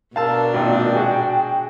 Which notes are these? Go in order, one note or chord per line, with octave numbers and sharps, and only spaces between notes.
B2 D4 A#4 F5 A5 E6
G#1 A#2 G5
F#4 G#4